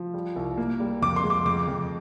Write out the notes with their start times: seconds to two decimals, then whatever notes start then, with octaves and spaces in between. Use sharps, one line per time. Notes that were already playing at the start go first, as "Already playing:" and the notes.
Already playing: F3
0.14 G3
0.36 C2
0.58 A#3
0.80 G3
1.02 F2 D6
1.16 C6
1.24 G#3
1.30 D6
1.45 F2 D6
1.68 F2